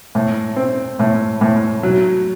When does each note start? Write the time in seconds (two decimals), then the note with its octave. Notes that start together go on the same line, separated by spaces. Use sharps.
0.15 A2
0.56 C4
0.99 A2
1.41 A2
1.83 F#3